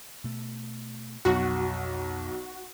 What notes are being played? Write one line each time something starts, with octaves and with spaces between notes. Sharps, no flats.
B2 A3
B1 F2 F#4